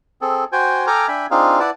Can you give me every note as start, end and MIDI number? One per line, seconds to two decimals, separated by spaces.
0.21 0.44 60
0.21 0.44 68
0.21 0.44 69
0.52 0.87 66
0.52 0.87 72
0.52 0.87 79
0.52 0.87 80
0.87 1.07 69
0.87 1.07 79
0.87 1.07 80
0.87 1.07 82
0.87 1.07 86
0.87 1.07 89
1.08 1.26 62
1.08 1.26 76
1.08 1.26 79
1.08 1.26 80
1.08 1.26 83
1.31 1.59 60
1.31 1.59 62
1.31 1.59 63
1.31 1.59 65
1.31 1.59 68
1.31 1.59 77
1.59 1.70 64
1.59 1.70 71
1.59 1.70 74
1.59 1.70 78
1.59 1.70 81